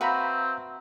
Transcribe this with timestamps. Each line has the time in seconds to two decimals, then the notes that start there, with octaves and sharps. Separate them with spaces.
0.01 C4 F#4 B4 E5 F5 A#5 B5